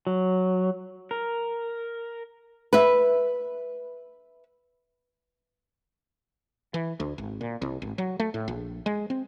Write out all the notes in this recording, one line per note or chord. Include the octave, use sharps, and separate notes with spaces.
F#3
A#4
B4 E5
E3
D2
G#1
A#2
C2
G#1
F#3
A3
A2
A#1
G#3
C4